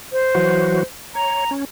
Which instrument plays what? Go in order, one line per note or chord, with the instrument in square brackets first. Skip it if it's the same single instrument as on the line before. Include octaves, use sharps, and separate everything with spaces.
[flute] C5
[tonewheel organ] E3 F#3 F#4
[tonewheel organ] C#5 [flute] A#5
[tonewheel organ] C#4